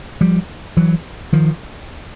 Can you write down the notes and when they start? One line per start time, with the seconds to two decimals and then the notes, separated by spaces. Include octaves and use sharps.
0.21 F3 G3
0.77 E3 F#3
1.33 D#3 F3